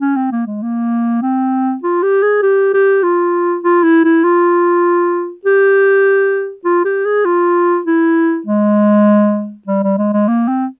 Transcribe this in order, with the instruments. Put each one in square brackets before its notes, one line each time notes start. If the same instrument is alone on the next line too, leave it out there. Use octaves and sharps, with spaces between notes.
[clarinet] C#4
C4
A#3
G#3
A#3
C4
F4
G4
G#4
G4
G4
F4
F4
E4
E4
F4
G4
F4
G4
G#4
F4
E4
G#3
G3
G3
G#3
G#3
A#3
C4